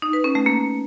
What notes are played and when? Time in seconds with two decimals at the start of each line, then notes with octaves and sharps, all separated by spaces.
0.02 D#4
0.13 B4
0.24 C#4
0.35 A3
0.46 A#3